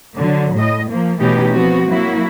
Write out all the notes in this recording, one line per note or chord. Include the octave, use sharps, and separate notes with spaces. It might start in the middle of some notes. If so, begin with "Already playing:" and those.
D3 F#3
A2 D#5
F3 A#3
B2 E3 A3 C#4 D#4 G4
F3 B3 C4 F#4
F#3 A#3 E4 F#4